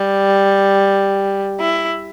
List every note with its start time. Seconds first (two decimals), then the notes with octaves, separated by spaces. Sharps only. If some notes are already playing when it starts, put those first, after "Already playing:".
Already playing: G3
1.60 E4